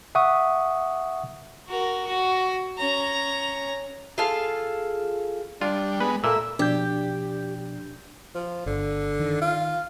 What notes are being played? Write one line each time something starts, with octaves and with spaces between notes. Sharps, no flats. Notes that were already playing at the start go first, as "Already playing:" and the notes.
E5 F#5 C#6 D#6
F#4 A#4
F#4
C#4 A#5
F4 G#4 A4 F5
G3 D4 F4
G#3 B3 B4
A#2 A#3 A4 E5 A#5 E6
B2 F3 D4 G4 D5 G6
F3
G1 D3
D#3
F4